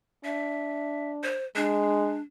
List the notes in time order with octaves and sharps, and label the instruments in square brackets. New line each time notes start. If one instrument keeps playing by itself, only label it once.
[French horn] D4 [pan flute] E5
[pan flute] C5
[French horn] G#3 [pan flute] D4